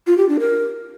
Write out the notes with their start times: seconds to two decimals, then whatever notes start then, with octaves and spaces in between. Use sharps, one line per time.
0.07 F4
0.18 G4
0.29 D4
0.40 A#4